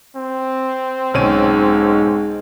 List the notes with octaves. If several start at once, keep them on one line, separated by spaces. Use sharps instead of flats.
C4
B1 G#2 C#4 D#7